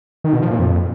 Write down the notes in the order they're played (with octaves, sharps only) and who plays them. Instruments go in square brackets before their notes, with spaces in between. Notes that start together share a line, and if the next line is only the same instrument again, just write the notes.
[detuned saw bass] D#3
B2
F3
A#2
F2